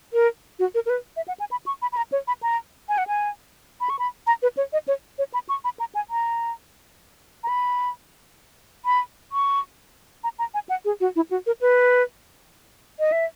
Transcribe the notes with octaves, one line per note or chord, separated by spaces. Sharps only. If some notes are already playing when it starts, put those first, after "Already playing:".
A#4
F#4
A#4
A#4
B4
E5
F#5
G#5
B5
C#6
B5
B5
A#5
C#5
B5
A#5
G#5
F#5
G#5
B5
C#6
B5
A#5
B4
C#5
D#5
C#5
C#5
B5
C#6
B5
A#5
G#5
A#5
A#5
B5
B5
C#6
A#5
A#5
G#5
F#5
G#4
F#4
E4
F#4
A#4
B4
D#5
E5